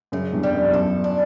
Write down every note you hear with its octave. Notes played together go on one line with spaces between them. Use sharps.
F#2 C#3
E2 G2
G3
F#2
E2
F#2 A4
D4